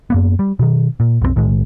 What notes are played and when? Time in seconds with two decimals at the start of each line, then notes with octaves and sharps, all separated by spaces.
0.10 F#2 A#3 B3
0.39 G3
0.59 B2 D#3
1.00 A#2
1.22 B1 F2 G3 C4
1.36 B1 A2 D#3 G#3